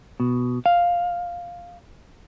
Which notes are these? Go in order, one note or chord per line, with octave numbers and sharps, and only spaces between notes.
B2
F5